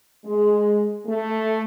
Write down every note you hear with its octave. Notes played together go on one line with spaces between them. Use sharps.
G#3
A3